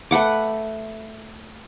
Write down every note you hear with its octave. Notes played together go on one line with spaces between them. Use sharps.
A3 B4 F#5 D6